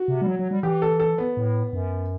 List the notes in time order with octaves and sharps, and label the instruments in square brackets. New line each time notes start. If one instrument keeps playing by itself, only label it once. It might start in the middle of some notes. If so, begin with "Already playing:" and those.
Already playing: [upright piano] F#4
[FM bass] C3
G3
F#3
F#3
G3
[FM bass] E3 [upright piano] G4
[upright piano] A4
A4
B3
[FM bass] A2
F#2